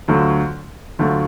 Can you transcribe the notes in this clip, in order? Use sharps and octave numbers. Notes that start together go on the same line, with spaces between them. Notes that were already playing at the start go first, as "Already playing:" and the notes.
D2 D3 F#3 A3 F4
D2 D3 F#3 A3 F4